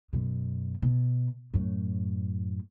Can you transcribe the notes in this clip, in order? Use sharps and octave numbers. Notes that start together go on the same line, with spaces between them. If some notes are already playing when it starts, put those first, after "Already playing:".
F#2 B2
B2
F#2 A2